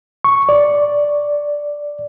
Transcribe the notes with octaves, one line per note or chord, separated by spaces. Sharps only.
C#6
D5